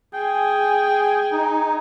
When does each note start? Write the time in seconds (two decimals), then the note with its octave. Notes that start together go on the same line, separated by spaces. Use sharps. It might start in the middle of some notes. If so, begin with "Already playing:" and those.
0.14 G#4 G5 G#5
1.32 D#4